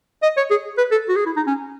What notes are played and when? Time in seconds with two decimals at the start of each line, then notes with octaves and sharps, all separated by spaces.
0.23 D#5
0.37 C#5
0.50 G#4
0.78 B4
0.91 A4
1.09 F#4
1.16 G#4
1.26 E4
1.37 D#4
1.47 C#4